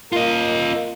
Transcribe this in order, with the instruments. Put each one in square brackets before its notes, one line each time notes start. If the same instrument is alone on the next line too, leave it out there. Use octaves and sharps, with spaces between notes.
[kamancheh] A#3 [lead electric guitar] F4 D#5